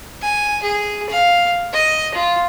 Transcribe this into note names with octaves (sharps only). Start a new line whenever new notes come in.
G#5
G#4
F5
D#5
F4